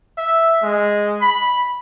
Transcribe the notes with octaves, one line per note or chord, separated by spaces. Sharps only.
E5
G#3
B5